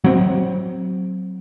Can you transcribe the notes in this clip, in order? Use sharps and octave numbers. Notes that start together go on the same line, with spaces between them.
F#3 C4